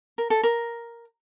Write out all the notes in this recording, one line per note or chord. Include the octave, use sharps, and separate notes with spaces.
A#4
A4
A#4